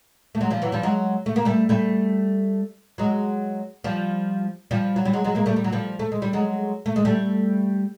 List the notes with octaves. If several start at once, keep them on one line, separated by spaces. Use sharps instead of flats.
A3
F#3 G#3
F3 G3
E3 F#3
F3 G3
F#3 G#3
A3
A#3
G3 A3
G3 A3
F#3 G#3
F3 G3
F3 G3
F#3
G3
F#3 G#3
F#3 G#3
G#3 A#3
G3 A3
G3
F#3
F3 G3
A3
G#3
G3
F#3 G#3
A3
G#3
G3 A3